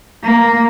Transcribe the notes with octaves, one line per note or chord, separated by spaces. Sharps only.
A#3